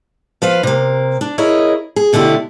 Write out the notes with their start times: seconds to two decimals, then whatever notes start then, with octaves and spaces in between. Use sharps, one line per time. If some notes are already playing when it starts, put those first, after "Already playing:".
0.42 F3 B4 F5
0.63 C3 A#3
1.21 D4
1.38 E4 G#4 A#4 C#5 D#5
1.96 G#4
2.13 B2 D3 A3 E4 G4